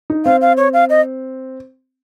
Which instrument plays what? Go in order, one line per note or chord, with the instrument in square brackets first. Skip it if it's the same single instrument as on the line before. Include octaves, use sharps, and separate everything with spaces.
[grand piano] D#4
[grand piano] C4 [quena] F5
[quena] F5
C#5
F5
D#5